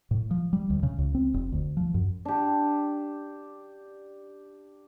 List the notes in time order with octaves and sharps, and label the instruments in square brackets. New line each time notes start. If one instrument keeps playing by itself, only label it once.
[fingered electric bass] A2
F3
G3
D2
C#3
C#2
C4
F1
D2
F3
F#2
[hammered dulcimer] D4 G4